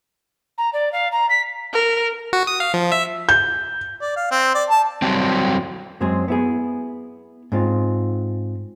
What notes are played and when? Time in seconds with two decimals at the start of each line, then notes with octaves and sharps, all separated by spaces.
0.58 A#5
0.73 D5
0.92 F5
1.12 A#5
1.29 B6
1.74 A#4
2.33 F#4
2.47 D#6
2.60 F5
2.74 F3
2.92 E5
3.29 G6
4.01 D5
4.16 F5
4.31 C4
4.55 D5
4.70 A5
5.02 F#3 G3 C4
6.01 F#2 G#3 C4 G#4
6.28 B3 E4 G#4
7.52 G#2 C4 F4